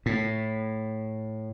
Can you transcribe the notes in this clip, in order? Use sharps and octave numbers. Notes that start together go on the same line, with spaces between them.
A2